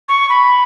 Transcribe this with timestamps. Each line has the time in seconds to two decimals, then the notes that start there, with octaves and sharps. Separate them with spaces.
0.09 C#6
0.29 B5